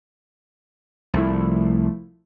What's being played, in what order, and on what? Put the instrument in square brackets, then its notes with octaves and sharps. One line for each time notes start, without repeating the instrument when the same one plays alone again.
[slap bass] C2 [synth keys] F3 A3 E4